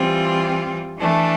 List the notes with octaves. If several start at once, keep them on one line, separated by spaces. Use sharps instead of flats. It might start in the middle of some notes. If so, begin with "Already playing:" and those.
Already playing: E3 G3 C4 F4
E3 A3 D4